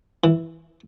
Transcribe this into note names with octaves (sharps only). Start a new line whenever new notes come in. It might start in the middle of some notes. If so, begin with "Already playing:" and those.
E3